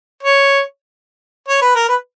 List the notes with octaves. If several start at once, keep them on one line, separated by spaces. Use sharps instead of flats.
C#5
C#5
B4
A#4
B4